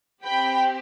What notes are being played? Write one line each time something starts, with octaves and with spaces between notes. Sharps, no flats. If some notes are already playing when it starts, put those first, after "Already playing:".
C4 G4 G5 B5